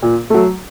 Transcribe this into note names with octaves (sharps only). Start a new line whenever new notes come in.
A#2
F#3 A3